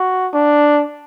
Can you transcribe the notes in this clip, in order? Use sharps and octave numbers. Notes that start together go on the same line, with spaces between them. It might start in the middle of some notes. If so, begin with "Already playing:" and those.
Already playing: F#4
D4